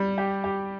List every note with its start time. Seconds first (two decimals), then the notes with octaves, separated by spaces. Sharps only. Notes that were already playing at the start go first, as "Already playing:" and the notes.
Already playing: G3
0.18 G4
0.44 G4